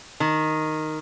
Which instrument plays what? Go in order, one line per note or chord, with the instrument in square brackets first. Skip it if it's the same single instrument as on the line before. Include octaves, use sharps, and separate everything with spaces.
[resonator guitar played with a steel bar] D#3